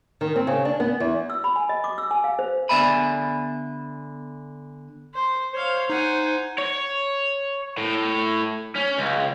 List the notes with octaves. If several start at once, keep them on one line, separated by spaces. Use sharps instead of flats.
D#3
C4
C#3
D4
B3
E2
E6
B5
G#5
D#5
D6
E6
G#5
F5
C5
D3 B3 D5 E5 G#5 B5
C5
C5 C#5 F5
D#4 F#5 G#5
C#5
A2
C#4
C#2